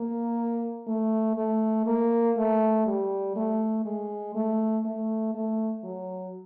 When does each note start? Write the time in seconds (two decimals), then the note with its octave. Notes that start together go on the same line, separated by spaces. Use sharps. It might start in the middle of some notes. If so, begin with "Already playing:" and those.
Already playing: A#3
0.87 A3
1.37 A3
1.86 A#3
2.37 A3
2.86 G3
3.36 A3
3.85 G#3
4.35 A3
4.85 A3
5.34 A3
5.84 F#3